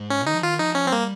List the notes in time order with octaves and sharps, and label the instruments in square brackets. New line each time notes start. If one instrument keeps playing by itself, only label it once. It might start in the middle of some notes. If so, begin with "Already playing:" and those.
Already playing: [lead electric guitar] G#2
[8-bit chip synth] C#4
[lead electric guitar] D#3 [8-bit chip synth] D#4
[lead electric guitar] F3
[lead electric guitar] D#3 [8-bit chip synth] F4
[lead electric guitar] F3 [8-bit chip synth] D#4
[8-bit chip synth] C#4
C4
[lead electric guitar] G3 [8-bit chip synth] A#3